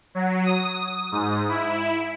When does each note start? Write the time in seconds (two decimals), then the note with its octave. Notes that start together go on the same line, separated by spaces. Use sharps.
0.15 F#3
0.45 D#6
1.12 G#2
1.48 E4